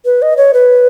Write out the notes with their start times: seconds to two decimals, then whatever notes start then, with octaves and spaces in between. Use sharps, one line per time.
0.05 B4
0.22 D#5
0.37 C#5
0.54 B4